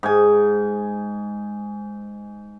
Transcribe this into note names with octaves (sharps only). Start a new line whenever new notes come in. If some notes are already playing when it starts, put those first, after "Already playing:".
G#2 G#5